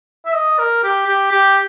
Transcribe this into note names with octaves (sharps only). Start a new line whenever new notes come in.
E5
D#5
A#4
G4
G4
G4